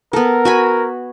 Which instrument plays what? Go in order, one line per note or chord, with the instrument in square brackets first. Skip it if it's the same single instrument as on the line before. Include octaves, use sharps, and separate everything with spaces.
[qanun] B3 A4 [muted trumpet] A#4
[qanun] F#4 G#5 B5